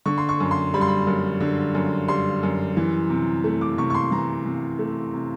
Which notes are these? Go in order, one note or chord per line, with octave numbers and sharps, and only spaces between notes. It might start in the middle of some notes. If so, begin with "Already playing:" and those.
D3 C#6
C6
C#6
F#2
C6
G3 B5
C6
B5
F#2
D3
F#2
G3 C6
F#2
E3
C3
A3
D6
C3 C#6
C#6
C6
E3 A#5
C3
A3
C3